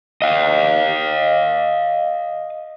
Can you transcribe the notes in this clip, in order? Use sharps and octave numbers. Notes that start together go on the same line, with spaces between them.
D#5 F5